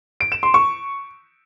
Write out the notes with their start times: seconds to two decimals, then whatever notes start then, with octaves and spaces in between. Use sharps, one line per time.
0.21 D7
0.32 E7
0.43 C6
0.54 C#6